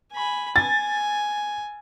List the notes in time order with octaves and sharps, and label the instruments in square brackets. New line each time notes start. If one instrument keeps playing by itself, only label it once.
[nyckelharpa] G#5 B5
[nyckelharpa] G#5 [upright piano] A6